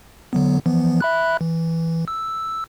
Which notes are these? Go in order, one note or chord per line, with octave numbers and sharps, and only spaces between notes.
D3 F#3 B3
E3 F3 B3
E5 B5 F#6
E3
E6